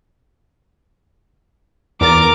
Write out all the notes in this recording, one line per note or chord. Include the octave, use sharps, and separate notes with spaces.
E2 A#4 D6 A6